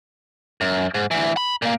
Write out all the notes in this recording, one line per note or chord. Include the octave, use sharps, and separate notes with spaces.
F#2
G#2
D2 E3
B5
A#2 A#3